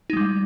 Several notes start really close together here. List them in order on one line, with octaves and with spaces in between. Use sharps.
D#4 G#3 G3